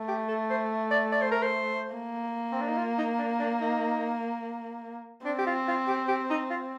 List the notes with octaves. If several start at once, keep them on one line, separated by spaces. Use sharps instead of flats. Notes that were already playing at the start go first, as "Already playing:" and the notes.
Already playing: A3
G4
A4
C5
D5
D5
C5
A#4
C5
A#3
C4
D4
D#4
F4
D#4
D4
D4
D#4
C4 D4
G4
F4
F4
G4
G4
D#4
F4